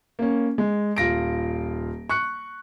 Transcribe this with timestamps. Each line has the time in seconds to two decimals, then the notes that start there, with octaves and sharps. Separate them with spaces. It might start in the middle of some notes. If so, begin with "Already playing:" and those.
0.19 A#3 C#4
0.58 G#3
0.97 D#1 F4 A#6 D7
2.09 C#6 F#6 C#7